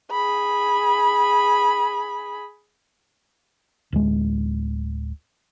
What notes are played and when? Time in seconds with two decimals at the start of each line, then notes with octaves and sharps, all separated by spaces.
0.11 G#4 B5
3.92 D1 G#3